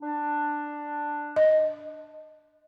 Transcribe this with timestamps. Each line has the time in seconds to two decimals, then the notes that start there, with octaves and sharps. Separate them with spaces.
0.01 D4
1.36 D#5